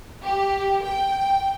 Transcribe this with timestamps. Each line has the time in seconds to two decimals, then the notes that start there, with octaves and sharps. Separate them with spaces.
0.24 G4
0.84 G5